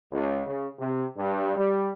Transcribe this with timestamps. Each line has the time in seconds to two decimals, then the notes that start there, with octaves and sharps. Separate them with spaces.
0.11 C#2
0.47 C#3
0.79 C3
1.17 G2
1.56 G3